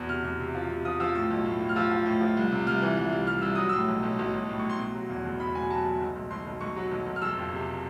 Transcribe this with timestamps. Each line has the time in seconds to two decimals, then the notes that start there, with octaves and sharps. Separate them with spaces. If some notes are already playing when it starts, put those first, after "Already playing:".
Already playing: E2 B2
0.09 C3 F6
0.24 E2 F6
0.40 C3
0.55 F3
0.70 C3
0.85 F3 D#6
1.00 F3 E6
1.15 A2 E6
1.30 B1
1.45 A2
1.61 A2
1.69 F6
1.76 F3 E6
1.91 F3
2.06 A2
2.21 F3
2.37 C2
2.52 C3
2.67 C2 F6
2.82 E3
2.97 C2
3.12 C2
3.27 C2 F6
3.42 C2 E6
3.55 F#3 D#6
3.69 A2 E6
3.88 B1
4.03 B1
4.19 B1
4.34 B1
4.49 A2
4.59 C#6
4.64 A2
4.69 C6
4.79 B2
4.95 F#3
5.10 E2
5.25 F#1
5.40 E2 B5
5.55 B2 G#5
5.70 F#3 A5
5.85 F#1
6.00 B1
6.16 B1
6.31 B1 C6
6.46 B1
6.60 B1 C#6
6.76 F#3
6.91 B1
7.06 B1
7.16 F6
7.22 F#1 E6
7.37 F2
7.52 C3